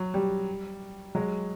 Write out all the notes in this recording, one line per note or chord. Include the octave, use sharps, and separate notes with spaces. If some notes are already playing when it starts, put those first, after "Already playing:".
Already playing: F#3
G3
F#3 G#3